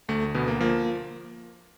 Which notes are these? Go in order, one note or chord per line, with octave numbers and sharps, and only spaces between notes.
D2 A3
D2 B2 B3
A#3
F3 A#3